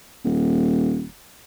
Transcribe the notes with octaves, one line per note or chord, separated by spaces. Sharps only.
D#1